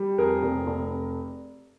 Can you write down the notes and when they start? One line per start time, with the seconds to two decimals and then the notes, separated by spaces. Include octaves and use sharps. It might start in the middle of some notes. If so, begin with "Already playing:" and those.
Already playing: G3
0.18 F2 G#4 A#4
0.43 F1
0.67 F1